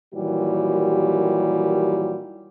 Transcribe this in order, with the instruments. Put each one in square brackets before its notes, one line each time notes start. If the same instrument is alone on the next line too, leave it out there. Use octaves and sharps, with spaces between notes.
[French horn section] A#2 D#3 E3 F#3 G3 G4